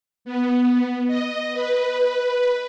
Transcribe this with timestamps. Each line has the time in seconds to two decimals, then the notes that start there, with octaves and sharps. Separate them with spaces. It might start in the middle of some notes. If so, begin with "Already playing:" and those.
0.25 B3
1.07 D#5
1.54 B4